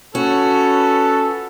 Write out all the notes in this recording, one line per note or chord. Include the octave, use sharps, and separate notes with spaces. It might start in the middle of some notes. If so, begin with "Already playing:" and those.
C#4 F#4 A4 B4